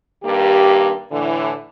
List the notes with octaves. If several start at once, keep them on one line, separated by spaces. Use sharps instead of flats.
G2 D#3 A#3 G4
A2 D3 E3